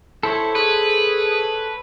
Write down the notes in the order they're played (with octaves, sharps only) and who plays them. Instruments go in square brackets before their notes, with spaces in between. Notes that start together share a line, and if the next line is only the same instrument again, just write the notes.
[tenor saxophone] E4 [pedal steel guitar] A4 C5 C#5
[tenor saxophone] G#4 [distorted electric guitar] B4